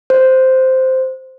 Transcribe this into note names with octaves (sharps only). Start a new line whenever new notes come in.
C5